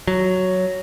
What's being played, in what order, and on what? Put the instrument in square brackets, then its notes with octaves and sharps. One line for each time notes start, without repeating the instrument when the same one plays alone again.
[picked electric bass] F#3